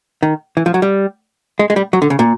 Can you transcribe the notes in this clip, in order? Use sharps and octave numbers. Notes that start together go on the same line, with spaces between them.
D#3
E3
F3
F#3
G3
G#3
G#3
G3
F#3
D3
C#3
A#2